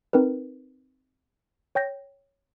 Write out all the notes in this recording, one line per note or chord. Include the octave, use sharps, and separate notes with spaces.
C4 D#4 A#4 B4
C#5 G5 G6 A#6